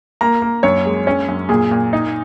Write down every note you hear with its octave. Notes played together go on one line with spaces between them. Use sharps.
A#3 A#5
A#3
F#2 C#5
G#3
C#4
F#2
A#2 G#4
A#2
D#4